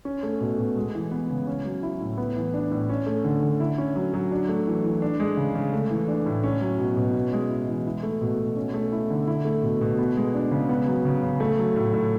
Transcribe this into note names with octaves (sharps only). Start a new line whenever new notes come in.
C#4
A3
B2
B2
G#3
E3
B3
C#3
C#4
F#3
E4
A2
B3
E3
D4
A2
C#4
A3
D3
D3
E4
C#4
F#3
F#3
D4
A3
E3
E3
D4
G#3
C#3
C#3
A3
E3
D4
A2
C#4
F#3
B2
B2
C#4
G#3
E4
E3
E4
A3
B2
B2
C#4
A3
E4
D3
E4
A3
B2
B2
B3
G#3
D4
C#3
B3
F#3
C#3
C#3
A3
F#3
A2
A2